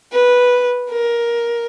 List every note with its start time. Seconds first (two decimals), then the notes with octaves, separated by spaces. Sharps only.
0.12 B4
0.89 A#4